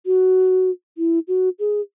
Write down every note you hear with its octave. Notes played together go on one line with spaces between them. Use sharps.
F#4
E4
F#4
G#4